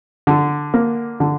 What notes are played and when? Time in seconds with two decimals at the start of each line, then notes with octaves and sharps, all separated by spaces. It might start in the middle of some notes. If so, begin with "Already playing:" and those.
0.27 D3
0.74 A#3
1.20 D3